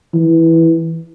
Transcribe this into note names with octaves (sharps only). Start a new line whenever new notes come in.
E3